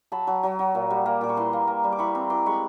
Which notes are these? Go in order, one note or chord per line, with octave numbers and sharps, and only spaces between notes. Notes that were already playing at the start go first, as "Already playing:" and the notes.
F#3 A5 B5
F#3
F#3
F#3
A#2
G3
A#3
A#2 D6
C#6
E3 A#5 C6
A#3
A#3
G3
D6
E3 B5 C#6
C4 A#5 C6
E3 C6 D6
G#3 B5 C#6